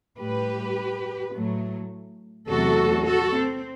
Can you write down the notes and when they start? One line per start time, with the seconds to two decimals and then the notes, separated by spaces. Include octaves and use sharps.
0.19 A2 G3 G4 B4
1.34 A2 F#3 A3
2.49 E2 C3 F#3 A3 F#4 A4
3.07 F#4 A4
3.36 C4